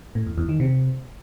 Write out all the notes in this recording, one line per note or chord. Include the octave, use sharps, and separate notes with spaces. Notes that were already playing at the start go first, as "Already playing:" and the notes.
A2
E2
E2
D#3
C3